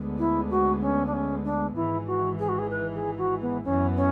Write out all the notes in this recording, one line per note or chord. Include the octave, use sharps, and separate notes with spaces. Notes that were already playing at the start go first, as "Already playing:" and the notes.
Already playing: D2 D3 G#3 B3
E4
F#4
C#4
D4
C#4
D4
G#1 G#2 E3 E4
F#4
G#4
F#4
G#4
B4
G#4
F#4
B3
F#2 E3 B3 C#4
C#4